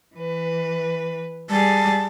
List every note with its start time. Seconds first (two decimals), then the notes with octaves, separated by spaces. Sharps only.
0.15 E3 B4
1.50 G3 G#4 A5